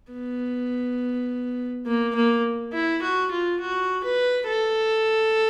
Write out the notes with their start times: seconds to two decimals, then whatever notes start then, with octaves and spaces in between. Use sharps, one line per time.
0.13 B3
1.86 A#3
2.15 A#3
2.73 E4
3.02 F#4
3.31 F4
3.60 F#4
4.04 B4
4.47 A4